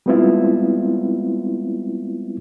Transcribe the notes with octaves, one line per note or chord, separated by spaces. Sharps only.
G3 G#3 B3 C4 E4 F4